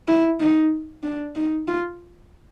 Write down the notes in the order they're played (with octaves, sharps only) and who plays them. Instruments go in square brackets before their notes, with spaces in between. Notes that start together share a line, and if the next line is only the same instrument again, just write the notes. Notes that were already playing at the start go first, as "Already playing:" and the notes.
[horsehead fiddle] E4
D#4
D4
D#4
F4